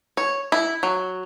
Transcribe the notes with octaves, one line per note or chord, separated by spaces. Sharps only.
C#5
E4
F#3